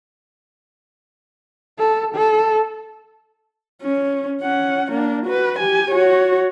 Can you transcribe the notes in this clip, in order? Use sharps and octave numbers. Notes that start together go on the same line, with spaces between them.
A4
A4
C#4
C#4 F#5
A#3 D4
F#4 B4
G4 G#5
F#4 C#5